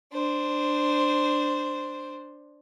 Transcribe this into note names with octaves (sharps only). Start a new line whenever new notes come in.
D4 C5